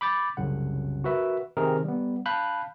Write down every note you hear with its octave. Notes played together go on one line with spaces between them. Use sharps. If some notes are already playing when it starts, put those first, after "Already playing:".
B5 D6 G6 A6
C2 F#2 C#3 F#5
F#4 A#4 B4 E5
C3 D#3 C4 D#4 G#4 A#4
G3 B3
F5 A5 B5 F#6 G6